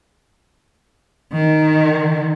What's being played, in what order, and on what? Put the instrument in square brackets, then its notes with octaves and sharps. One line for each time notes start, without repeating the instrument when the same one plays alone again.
[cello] D#3